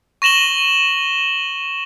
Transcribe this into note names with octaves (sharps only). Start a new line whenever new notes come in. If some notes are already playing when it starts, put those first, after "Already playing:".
C#6 A#6 E7 F#7 G7